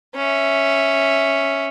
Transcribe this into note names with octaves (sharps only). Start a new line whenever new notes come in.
C#4 E5